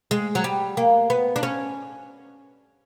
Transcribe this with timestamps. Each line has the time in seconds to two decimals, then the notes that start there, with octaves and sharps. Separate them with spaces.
0.11 G#3
0.35 F#3
0.44 G3
0.77 A#3
1.10 B3
1.36 D4
1.43 C#4